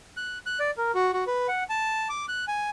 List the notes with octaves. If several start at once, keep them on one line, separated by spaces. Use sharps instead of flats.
F#6
F#6
D5
A#4
F#4
F#4
B4
F#5
A5
D6
F#6
G#5